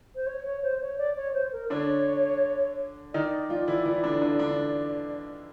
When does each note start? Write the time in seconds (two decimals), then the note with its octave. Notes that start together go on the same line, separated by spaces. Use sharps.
0.15 C5
0.27 C#5
0.45 C#5
0.63 C5
0.81 C#5
0.98 D5
1.16 C#5
1.34 C5
1.52 A#4
1.70 D3 D4 C#5
3.13 D#3 D#4 D5
3.50 F3 F4
3.68 E3 E4
3.86 E3 E4
4.04 D3 D4
4.22 D3 D4
4.39 D3 D4